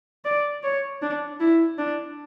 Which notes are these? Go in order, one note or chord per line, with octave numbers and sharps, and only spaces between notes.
D5
C#5
D4
E4
D4